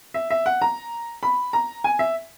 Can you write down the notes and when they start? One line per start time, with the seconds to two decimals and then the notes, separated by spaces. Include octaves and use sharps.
0.14 E5
0.30 E5
0.46 F#5
0.62 A#5
1.23 B5
1.53 A#5
1.84 G#5
1.99 E5